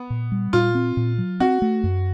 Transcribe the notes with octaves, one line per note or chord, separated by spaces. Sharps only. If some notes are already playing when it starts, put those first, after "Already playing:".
Already playing: B3
A#2
G3
A#2 F4
C4
A#2
F#3
C4 F#4
A3
F#2